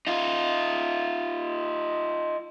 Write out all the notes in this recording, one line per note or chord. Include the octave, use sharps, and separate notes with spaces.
D#4 F4